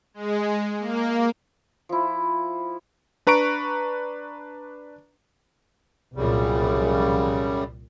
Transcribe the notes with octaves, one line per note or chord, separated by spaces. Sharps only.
G#3
A#3
F3 E4
D4 B4 A#5 C#6 D7
C2 F#2 A#2 C#3 F3 G3